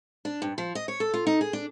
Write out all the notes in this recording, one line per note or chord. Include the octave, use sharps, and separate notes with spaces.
D4
G2
F3
D#5
C#5
A4
F4
D#4
G#4
D4